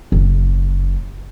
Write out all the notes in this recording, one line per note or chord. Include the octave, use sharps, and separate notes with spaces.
F#1